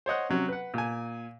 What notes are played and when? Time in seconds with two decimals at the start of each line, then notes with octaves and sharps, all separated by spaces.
0.06 C5 C#5 D#5 F#5
0.29 C3 F#3 C#4
0.48 B4 F#5
0.74 A#2 G#5